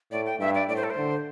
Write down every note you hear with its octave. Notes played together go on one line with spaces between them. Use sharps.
A2 D5
G5
G2 E5
D5
A2 D5
C5
A4
C5
D3